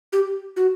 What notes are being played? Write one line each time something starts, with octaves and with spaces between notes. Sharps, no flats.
G4
F#4